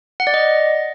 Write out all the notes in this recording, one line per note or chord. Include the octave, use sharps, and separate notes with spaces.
F#5
D5
D#5